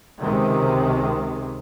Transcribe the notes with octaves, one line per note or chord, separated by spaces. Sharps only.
C#2 C3 D#3 G#3